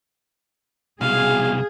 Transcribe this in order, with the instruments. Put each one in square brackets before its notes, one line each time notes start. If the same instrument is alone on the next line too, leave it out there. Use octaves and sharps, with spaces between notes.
[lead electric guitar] C2 B2 [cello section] G#4 [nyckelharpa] F5